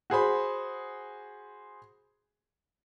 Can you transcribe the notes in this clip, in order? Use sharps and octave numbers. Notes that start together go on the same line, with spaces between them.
F#4 G#4 C5 B5